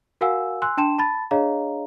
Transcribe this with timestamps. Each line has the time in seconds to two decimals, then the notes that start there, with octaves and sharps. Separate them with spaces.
0.21 F#4 A#4 F5 F#5 G#5 E6
0.62 G#5 C6 E6 F#6
0.77 D4 G5 A5 C6 E7
0.98 A5 B5 A6
1.31 D4 G#4 C#5 D#5 F5 A#5